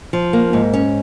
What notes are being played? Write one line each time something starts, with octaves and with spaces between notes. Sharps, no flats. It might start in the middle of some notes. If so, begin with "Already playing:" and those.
F3
A#3
G#2
C#4